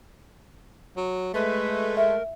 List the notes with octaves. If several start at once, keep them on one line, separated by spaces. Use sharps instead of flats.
F#3
G#3 A3 B4
A#4 E5